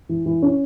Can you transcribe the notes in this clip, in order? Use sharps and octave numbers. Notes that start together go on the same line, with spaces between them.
E3
E3
C#4